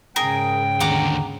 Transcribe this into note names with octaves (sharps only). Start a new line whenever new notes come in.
G#2 C#3 G#4 A#4 G5
D#2 D3 F#5 A#5 D6